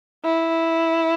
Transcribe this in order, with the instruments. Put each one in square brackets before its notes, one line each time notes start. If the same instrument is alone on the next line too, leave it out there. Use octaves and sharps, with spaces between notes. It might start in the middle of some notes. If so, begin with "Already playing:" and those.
[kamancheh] E4